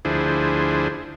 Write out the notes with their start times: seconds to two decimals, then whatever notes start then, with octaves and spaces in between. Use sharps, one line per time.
0.05 D2 F3 D4 E4 G#4 C5